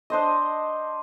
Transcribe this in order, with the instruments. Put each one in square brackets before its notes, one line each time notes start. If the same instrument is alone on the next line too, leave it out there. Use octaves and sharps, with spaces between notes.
[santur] D4 C5 D#5